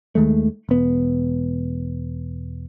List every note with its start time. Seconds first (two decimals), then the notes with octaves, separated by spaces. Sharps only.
0.15 D#2 D#3 G#3 A3
0.69 E1 B3